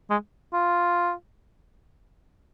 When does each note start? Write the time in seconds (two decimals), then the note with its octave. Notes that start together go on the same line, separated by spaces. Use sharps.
0.10 G#3
0.53 F4